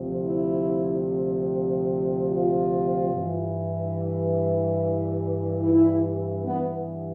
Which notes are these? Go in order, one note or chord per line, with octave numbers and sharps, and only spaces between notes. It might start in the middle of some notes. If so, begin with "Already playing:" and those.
Already playing: D2 C3 F3
E4
F4
G2 E3
E4
G2 E3 B3